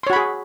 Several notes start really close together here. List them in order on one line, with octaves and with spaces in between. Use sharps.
C6 C#5 F#4 B5 G#4